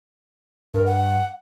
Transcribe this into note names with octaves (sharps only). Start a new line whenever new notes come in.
G2 A#4
F#5